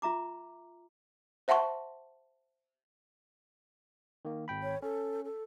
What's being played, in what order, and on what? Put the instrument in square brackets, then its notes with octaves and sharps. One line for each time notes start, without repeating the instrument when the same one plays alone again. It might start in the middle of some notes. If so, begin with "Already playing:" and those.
[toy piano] F4 E5 A#5 D6
[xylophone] C5 E5 F#5 A5 C6 C#6
[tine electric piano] D#3 A#3
G#1 G5 B5
[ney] C#5
[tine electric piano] C#4 [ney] A4
[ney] A4